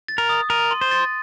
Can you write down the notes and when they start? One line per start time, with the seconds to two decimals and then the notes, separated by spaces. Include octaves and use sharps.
0.08 A6
0.18 A#4
0.29 D#6
0.50 A#4 D#7
0.71 C6
0.81 C5
0.91 A6